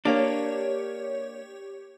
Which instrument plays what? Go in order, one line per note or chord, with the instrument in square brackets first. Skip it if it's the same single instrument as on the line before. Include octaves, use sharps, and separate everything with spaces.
[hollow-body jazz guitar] A#3 D4 [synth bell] G4 C#5